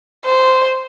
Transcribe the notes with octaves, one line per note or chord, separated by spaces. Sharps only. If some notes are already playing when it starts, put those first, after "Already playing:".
C5